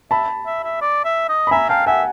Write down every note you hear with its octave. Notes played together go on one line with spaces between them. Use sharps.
E5 A5 B5
E5
E5
D5
E5
D#5
B5
E5 G#5 A#5
F5 G5 A5
E5 F#5 G#5